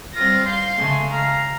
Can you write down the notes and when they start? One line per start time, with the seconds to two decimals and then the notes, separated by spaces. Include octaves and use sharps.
0.16 G3 C4 F4 A#6
0.45 F5 C6 G6
0.77 C#3 G#3 A3
1.12 F5 A#5